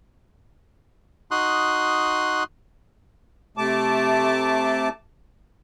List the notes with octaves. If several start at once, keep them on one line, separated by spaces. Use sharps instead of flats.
D#4 F#4 C6 D#6 F#6
C3 A3 A5 D6